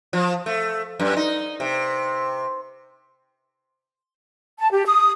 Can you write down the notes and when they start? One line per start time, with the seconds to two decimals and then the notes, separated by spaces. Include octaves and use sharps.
0.13 F3
0.46 A3
1.00 F#2
1.17 D#4
1.60 C3
4.59 A5
4.72 G4
4.85 D#6